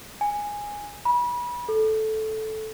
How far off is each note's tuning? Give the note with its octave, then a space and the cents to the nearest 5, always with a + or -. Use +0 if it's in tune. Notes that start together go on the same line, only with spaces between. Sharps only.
G#5 -10
B5 -30
A4 -10